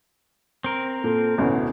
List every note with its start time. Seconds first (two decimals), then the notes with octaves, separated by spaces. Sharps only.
0.64 C4 A#4
1.04 A#2 A4
1.38 A1 D2 B2 C#4